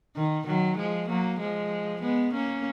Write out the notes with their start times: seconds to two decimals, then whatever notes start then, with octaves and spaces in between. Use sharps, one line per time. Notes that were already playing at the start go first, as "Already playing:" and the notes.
0.16 D#3
0.46 D#3 F#3
0.78 F3 G#3
1.08 F#3 A#3
1.39 F3 G#3
2.02 G#3 B3
2.33 A#3 C#4